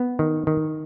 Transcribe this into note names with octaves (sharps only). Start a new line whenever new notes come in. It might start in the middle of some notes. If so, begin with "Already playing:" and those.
Already playing: B3
D#3
D#3